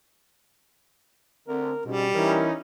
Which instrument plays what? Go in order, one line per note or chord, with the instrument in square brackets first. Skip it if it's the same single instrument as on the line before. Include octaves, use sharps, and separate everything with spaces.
[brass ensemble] D2 D3 [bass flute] C4 [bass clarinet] A#4
[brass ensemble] G#2 [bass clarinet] B2 [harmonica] G3 [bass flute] C#4
[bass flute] E3 [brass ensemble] C#4 D#4 [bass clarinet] A#4